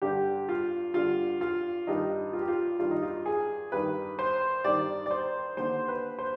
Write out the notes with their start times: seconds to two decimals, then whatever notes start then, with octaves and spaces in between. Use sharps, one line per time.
0.02 G2 D3 G4
0.49 F4
0.94 G2 D3 F4
1.41 F4
1.87 G2 D#3 D#4
2.33 F4
2.40 G4
2.48 F4
2.80 G2 D#3 F4
2.91 D#4
3.03 F4
3.26 G#4
3.72 G2 D#3 B4
4.19 C5
4.64 G2 D#3 D5
5.06 D5
5.11 C5
5.57 D#2 D3 C5
5.88 B4
6.19 C5